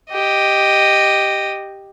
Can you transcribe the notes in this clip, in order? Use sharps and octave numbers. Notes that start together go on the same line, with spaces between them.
G4 D#5